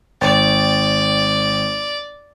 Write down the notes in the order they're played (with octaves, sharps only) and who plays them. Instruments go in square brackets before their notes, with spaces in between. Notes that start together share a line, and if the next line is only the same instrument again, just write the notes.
[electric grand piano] G#1 G5 A6 [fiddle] D5